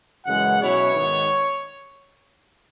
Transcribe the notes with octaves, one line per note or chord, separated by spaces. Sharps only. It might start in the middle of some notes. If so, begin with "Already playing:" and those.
F#2 C#3 E3 G#3 F#5
B2 F#3 C#4 E4 C#5
G#2 D#3 G#3 B3